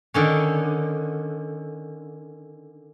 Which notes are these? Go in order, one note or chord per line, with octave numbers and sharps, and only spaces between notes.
D3 D#3 C#4